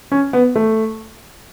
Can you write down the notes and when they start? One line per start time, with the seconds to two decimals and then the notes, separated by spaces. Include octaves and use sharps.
0.12 C#4
0.33 B3
0.56 A3